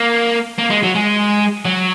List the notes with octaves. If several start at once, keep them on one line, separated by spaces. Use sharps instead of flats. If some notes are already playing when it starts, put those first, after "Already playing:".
Already playing: A#3
A#3
G#3
F#3
G#3
F#3